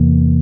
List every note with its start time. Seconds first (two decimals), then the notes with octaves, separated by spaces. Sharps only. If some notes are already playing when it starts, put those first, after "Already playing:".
Already playing: E2 C3 E3 A#3